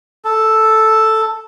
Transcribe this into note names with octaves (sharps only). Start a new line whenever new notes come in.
A4